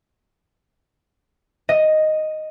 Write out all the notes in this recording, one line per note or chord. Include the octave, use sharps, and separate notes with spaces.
D#5